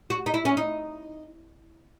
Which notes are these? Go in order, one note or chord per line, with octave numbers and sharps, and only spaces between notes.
F#4
D#4
E4
C#4
D#4